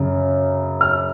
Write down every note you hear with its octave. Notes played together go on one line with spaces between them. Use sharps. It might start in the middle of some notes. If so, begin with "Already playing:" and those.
Already playing: F#2 C#3
F6